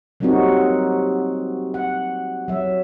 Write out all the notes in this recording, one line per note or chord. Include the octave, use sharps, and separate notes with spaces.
F#3 G3 A#3 C4 D#4 F#4
F#5
F#3 E5